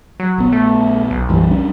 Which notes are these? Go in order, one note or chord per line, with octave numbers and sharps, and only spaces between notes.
F#3
A#1 B3
A3
B1
F#2 E3 G3
G3 C#4 D4